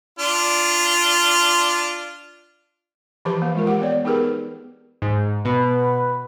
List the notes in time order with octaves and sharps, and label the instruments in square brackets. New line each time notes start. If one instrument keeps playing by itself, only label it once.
[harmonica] D4 F4
[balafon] E3 F3 G4 B4 A5 B5
A#3
G#3 F4 A#4
G4 F#5
B3 C#5 D5
B3 D#4 G4 G#4 A#4 B4
[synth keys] G#2
[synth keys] B2 [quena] B4